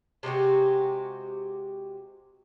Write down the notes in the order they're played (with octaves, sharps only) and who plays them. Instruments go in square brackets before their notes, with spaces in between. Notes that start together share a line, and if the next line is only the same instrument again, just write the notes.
[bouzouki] C3 G#3 F#4 G4